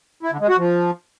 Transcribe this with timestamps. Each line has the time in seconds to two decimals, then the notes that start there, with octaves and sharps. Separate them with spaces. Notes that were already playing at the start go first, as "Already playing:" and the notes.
0.23 E4
0.32 D3
0.40 G#3
0.49 F#4
0.58 F3